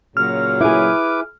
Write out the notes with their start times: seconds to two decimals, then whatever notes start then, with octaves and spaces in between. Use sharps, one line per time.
0.17 A#2 C#3 F#3 F6
0.60 E4 G#4 B4 D6